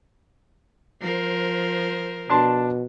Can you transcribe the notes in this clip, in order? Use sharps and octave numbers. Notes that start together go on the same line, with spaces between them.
F3 A#4 C5
B2 D4 A5 C6